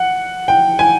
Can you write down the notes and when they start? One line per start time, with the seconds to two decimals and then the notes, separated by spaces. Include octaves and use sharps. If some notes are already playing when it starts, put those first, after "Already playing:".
Already playing: F#5
0.48 G5
0.79 G#5